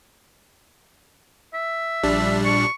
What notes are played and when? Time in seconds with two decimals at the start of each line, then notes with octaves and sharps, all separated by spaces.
1.54 E5
2.03 A#1 G3 D4
2.45 C#6